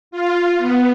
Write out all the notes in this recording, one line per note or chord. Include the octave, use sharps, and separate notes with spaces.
F4
B3